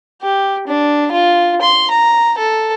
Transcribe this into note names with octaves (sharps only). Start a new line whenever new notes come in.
G4
D4
F4
C6
A#5
A4